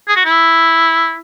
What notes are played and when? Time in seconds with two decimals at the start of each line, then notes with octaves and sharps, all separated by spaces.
0.08 G#4
0.16 F#4
0.25 E4